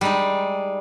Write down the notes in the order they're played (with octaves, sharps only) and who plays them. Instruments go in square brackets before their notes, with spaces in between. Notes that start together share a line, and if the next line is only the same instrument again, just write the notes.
[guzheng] G3 G#3 D#4